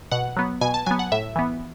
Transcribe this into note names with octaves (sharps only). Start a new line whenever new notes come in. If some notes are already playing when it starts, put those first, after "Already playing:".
B2 F#5
F#3 B3
B2 G#5
A5
F#3 B3 G#5
F#5
A2 E5
E3 B3